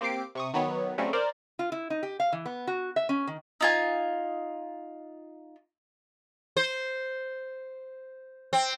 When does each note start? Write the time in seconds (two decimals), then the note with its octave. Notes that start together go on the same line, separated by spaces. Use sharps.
0.01 A#3 C4 G4 D6 C7 D7
0.35 C3 C#6 D#6
0.54 D#3 F#3 B3 C#5
0.98 C#3 F#3 G3 A3 C4 C#4
1.13 A#4 C5 D5
1.59 F4
1.72 E4
1.90 D#4
2.03 G4
2.20 F5
2.32 E3
2.46 B3
2.67 F#4
2.96 E5
3.09 C#4
3.27 D#3
3.61 D#4 F4 G#5
6.57 C5
8.53 C4